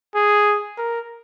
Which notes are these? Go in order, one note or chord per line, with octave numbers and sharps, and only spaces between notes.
G#4
A#4